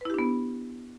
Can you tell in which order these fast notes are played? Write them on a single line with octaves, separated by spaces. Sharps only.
B4 E4 G4 D4 B3